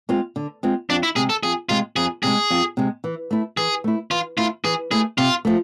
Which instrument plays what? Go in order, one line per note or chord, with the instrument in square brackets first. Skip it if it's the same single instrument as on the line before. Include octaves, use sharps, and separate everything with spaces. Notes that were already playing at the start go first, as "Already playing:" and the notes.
[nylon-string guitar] G#3 C4 F4
D3
G#3 C4 F4
[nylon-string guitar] F2 [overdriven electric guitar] D4
[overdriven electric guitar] E4
[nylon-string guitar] C3 G#3 [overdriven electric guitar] G#4
[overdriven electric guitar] A4
[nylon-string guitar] F2 [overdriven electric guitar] G#4
[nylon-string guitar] C3 G#3 [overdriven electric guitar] F4
[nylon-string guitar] F2 [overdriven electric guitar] G#4
[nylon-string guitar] C3 G#3 [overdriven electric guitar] G#4
[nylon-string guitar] F2
C3 G#3
E3
A3 E4
[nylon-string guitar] E3 [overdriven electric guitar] G#4
[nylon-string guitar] A3 E4
[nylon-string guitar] E3 [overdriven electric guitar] F4
[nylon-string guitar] A3 E4 [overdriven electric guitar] F4
[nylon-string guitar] E3 [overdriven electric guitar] G#4
[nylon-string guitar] A3 E4 [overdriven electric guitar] G#4
[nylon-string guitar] C3 [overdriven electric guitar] F4
[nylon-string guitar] F3 A3